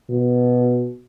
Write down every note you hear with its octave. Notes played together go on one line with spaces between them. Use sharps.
B2